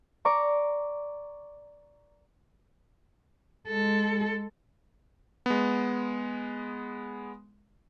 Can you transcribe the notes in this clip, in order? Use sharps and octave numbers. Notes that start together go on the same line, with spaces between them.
D5 A#5 C#6 D6
G#3 A4
G#3 B3